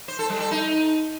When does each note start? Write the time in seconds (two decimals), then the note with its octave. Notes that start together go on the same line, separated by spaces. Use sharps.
0.08 C5
0.19 A4
0.30 G3
0.40 A4
0.51 D#4